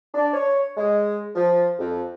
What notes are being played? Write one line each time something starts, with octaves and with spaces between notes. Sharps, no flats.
D4
C#5
G#3
F3
F2